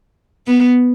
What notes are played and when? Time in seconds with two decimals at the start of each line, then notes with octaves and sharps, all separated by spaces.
0.47 B3